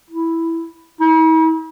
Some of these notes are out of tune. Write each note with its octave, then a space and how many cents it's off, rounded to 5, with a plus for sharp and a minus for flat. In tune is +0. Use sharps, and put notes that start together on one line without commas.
E4 +0
E4 -45